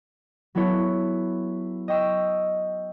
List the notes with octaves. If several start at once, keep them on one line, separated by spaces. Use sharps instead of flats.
F#3 B3 E4 A4 C#5
D#5 G5 C#6 E6